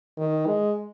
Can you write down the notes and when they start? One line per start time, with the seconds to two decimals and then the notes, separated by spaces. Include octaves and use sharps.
0.18 D#3
0.46 G#3